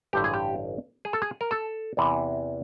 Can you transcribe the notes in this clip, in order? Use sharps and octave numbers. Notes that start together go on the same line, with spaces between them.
A1 G2 D3 G4
G#4
G4
G#4
A4
G#4
A#4
A4
E2 C3 E3